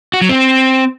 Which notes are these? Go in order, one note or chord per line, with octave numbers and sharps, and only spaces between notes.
F#4
F#3
C4